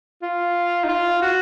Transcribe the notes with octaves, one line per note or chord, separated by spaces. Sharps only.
F4
D#4
F4
F#4